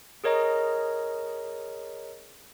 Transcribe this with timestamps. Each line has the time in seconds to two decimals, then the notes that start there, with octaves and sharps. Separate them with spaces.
0.24 G#4 A#4 C#5 D#5 A#5